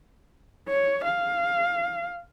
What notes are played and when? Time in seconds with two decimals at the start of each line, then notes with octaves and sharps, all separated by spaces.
0.69 C#5
1.04 F5